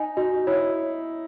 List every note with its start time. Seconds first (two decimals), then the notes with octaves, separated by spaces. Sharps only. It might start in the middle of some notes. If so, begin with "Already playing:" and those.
Already playing: D#4 G#5
0.17 D#4 F#4
0.47 E4 C#5